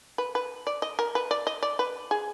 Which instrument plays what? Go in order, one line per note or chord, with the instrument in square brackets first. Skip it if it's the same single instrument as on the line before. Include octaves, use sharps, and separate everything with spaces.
[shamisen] B4
B4
D5
D#5
A#4
B4
D5
D#5
D5
B4
G#4